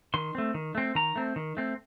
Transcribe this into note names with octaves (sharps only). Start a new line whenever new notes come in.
D#3 C6
A3 C4
D#3
A3 C4
D#3 A#5
A3 C4
D#3
A3 C4